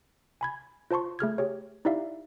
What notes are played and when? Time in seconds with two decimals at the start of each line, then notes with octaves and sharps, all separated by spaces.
0.41 G#5 B5 G#6
0.91 F4 C5 A5 C6 C#6
1.19 A3 G#4 F6 G#6
1.38 G4 G#4 C#5
1.85 D#4 E4 G4 D5 E5 F5